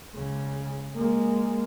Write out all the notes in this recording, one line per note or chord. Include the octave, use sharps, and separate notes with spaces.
C#2 C#3
G#3 A#3